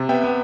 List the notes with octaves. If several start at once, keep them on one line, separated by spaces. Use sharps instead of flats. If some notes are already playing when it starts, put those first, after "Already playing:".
Already playing: C3
B3 E5 G5
B3